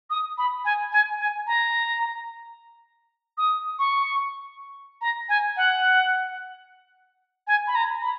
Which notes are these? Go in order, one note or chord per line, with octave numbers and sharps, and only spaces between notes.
D#6
B5
G#5
G#5
G#5
A#5
D#6
C#6
A#5
G#5
F#5
G#5
B5
A#5
B5